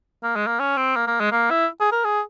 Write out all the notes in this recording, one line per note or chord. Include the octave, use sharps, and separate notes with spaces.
A#3
G#3
A#3
C#4
C4
A#3
A#3
G#3
A#3
E4
G#4
A#4
G#4